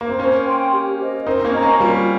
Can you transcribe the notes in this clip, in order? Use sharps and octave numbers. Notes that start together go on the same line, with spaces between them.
A#3
C4
A#3 C#4 C5
G5 C6
G4
C5 D#5
C4 D#4 A#4
A#3 C#4
D#5 A#5 C#6
A#3 C#4
G3 A#3 F4